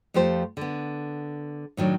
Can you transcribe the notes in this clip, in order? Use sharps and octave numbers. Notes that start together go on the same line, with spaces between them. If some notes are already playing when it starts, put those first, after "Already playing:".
F2 F3 A3 G4 C5
D3 B3
A2 D#3 F#3 D4